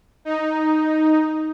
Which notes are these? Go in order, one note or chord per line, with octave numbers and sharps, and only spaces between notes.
D#4